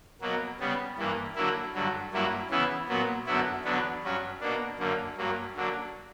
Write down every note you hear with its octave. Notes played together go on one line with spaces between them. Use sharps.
B2 F#3 A#3
C#3 G3 B3
G2 E3 A#3
D3 F#3 A#3 E4
G2 D3 F#3
G2 F#3 A#3 E4
C#3 E3 B3 E4
A#2 F#3 B3
F#2 D3 F#3 B3 E4
E2 D3 F#3 B3 D4
G2 F#3 C#4
B2 A#3 D4
F#2 D3 A#3
G2 F#3 A#3
D3 F#3 A#3 D4